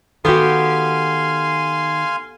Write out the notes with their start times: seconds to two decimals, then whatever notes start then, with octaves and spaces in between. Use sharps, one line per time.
0.25 D#3 B3 F#4 G4 A4 F5 G#5 C6